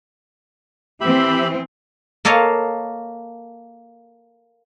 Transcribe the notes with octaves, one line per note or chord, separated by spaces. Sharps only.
E3 C4 G4 E5 B5
A#3 A4 C#5 D#5 F5